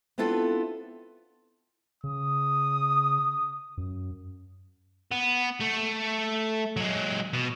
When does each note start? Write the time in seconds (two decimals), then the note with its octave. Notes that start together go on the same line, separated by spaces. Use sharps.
0.18 B3 C4 D4 E4 F4 A4
2.04 C#3 D#6
3.77 F#2
5.11 B3
5.60 A3
6.77 F#3 G#3
7.34 B2